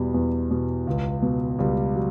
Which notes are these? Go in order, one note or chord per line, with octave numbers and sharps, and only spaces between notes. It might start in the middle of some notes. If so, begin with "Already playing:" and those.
Already playing: E2 B2 G3
E2
B2
C#2
B2
C#2 G3
F#3